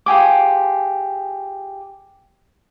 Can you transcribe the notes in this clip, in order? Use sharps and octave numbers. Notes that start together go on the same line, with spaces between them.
F4 G4 G#4 D6